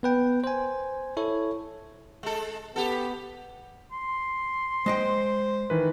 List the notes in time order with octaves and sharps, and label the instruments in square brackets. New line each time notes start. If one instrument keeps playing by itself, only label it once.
[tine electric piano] B3 B4 G5
C5 G#5
E4 A4 C#5
[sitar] G#3 A4
[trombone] B3 [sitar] G4 A4
[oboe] C6
[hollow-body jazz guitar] G#3 D#5 G5 [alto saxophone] C5
[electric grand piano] D#3 E3 B4